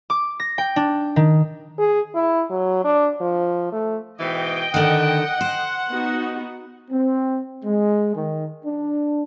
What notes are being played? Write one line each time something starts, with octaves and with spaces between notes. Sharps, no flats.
D6
A#6
G5
D4
D#3
G#4
E4
F#3
D4
F3
A3
G#2 B2 E3 D#5 G5
D3 D#3 F#5
C5
B3 D#4 F#4
C4
G#3
D#3
D4